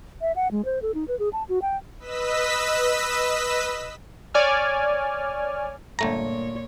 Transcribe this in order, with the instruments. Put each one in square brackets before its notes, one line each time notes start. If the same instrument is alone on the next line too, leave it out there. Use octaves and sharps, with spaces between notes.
[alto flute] E5
F#5
G#3
C5
A4
D#4
B4
G#4
A5
F#4
G5
[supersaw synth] B4 D#5 E6 B6
[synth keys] C#5 D5 G#5 F6
[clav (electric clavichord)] G1 A3 A#5 [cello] A#2 C#5